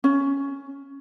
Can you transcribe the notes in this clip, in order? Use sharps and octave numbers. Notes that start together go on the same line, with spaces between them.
C#4